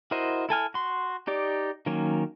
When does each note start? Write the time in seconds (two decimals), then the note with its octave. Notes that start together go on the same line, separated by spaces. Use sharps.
0.11 E4 F#4 A#4 C5 D#5
0.49 E4 A4 G#5 F6
0.74 F#4 C6
1.27 D#4 G4 D5
1.86 D#3 F#3 A#3 C#4